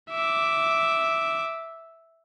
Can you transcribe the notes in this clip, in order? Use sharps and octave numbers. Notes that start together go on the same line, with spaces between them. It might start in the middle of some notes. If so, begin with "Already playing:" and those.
E5 D6